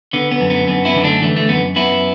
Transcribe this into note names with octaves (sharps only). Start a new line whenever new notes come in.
D3 B3
B3
F#2
B3
F#2 B3
B3 E4
D3
A3 D4
E3 A3
A3
F#2 B3
F#2 B3 E4